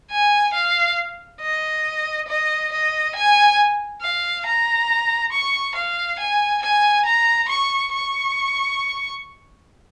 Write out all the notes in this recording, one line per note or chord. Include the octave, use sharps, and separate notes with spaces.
G#5
F5
D#5
D#5
D#5
G#5
F5
A#5
C#6
F5
G#5
G#5
A#5
C#6
C#6